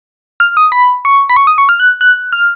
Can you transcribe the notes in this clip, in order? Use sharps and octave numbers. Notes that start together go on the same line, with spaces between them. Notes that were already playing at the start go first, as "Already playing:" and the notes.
F6
D#6
B5
C#6
B5
C#6
D#6
C#6
F6
F#6
F#6
F6